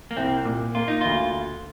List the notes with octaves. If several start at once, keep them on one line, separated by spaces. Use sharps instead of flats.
A#3
C2 C4
A#2
A#3 F4
D#4
D2 F4